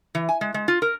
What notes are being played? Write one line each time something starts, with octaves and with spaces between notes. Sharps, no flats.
E3
G#5
G#3
G#3
F4
A#4